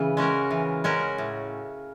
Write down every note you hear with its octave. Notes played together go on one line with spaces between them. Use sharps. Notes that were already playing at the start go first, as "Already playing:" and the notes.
Already playing: C#3 E3
G#3 C#4 F#4 A#4
E3
G#3 C#4 F#4 A#4
A2